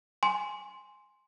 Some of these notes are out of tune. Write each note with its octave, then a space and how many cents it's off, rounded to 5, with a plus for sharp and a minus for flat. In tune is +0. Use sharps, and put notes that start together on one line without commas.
G#5 +0 C6 +5